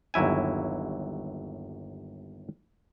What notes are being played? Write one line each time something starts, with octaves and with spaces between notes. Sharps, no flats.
G1 D#2 F#3 E4 G#5